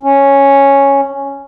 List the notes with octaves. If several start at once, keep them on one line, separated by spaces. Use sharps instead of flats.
C#4